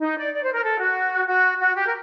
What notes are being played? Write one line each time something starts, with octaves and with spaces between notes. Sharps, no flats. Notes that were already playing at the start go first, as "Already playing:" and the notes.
D#4
D5
D5
C5
A#4
A4
F#4
F#4
F#4
G4
A#4